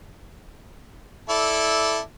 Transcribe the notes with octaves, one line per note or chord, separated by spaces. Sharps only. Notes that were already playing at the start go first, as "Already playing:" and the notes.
E4 A4 D5